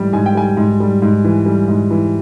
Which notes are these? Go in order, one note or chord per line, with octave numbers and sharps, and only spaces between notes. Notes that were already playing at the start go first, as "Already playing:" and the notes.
Already playing: G#2 E3 G3
G#2 G#5
G5
G3 G#5
G#2
G3
G#2
E3
G3
G#2
E3